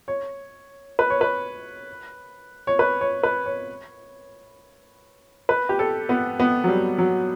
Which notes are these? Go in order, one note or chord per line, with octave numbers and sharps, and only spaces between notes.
C#5
B4
C#5
B4
C#5
B4
C#5
B4
C#5
B4
G4
A4
B3
B3
F#3
G3
F#3